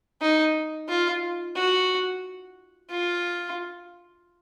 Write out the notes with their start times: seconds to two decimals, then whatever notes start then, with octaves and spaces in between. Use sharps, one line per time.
0.21 D#4
0.89 F4
1.56 F#4
2.91 F4